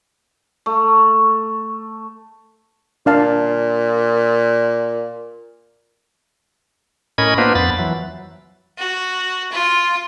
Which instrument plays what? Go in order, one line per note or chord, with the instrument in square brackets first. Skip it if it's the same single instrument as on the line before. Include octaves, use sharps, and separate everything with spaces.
[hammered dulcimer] A3
[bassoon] A#2 [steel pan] D4 F5 A5
[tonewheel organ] A2 C#4 A#4 D#5 B5 G#6
A#3 B3 D4 F4 B4 C5
F2 B3 B5 A6
E3 F#3
[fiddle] F#4
F4